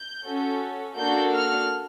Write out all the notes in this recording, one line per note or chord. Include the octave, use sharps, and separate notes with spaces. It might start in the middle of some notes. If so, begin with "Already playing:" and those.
Already playing: G6
C#4 F#4 A4
A#3 D4 F#4 A4 G6
F6